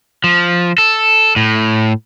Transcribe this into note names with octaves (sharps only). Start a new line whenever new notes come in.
F3
A4
A2